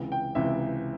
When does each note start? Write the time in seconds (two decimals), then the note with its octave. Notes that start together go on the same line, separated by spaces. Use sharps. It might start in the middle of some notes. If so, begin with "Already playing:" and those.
Already playing: C#2 C3 E3
0.12 G5
0.35 C#2 C3 E3 E5